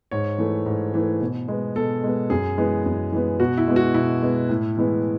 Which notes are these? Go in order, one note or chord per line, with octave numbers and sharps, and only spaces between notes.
G#2 C#5
E3 A3
G#2
E3 A3
B2
G#3 B3
B2 A4
G#3 B3
F#2 G#4
E3 G#3 B3
F#2
E3 G#3 B3
B2 F#4
E4
G#3 B3
F#4
B2 E4
G#3 B3
A2
E3 G#3 B3